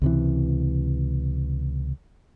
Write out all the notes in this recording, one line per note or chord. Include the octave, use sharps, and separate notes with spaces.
C#2 C3 E3